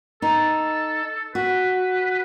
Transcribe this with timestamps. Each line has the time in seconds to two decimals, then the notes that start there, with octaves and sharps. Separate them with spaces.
0.22 D#4 A4
1.35 F#4 B4